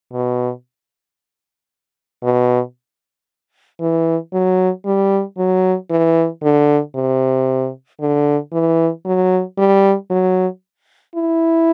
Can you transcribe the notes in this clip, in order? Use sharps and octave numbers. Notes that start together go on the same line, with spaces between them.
B2
B2
E3
F#3
G3
F#3
E3
D3
C3
D3
E3
F#3
G3
F#3
E4